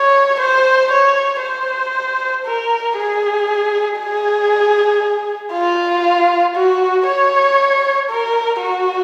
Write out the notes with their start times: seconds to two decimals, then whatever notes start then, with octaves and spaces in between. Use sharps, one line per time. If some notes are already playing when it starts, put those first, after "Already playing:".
Already playing: C#5
0.40 C5
0.92 C#5
1.43 C5
2.46 A#4
2.97 G#4
3.99 G#4
5.53 F4
6.56 F#4
7.07 C#5
8.10 A#4
8.61 F#4